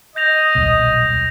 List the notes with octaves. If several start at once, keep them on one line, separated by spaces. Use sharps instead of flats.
D#5 G6 A#6 F7
D#1 B1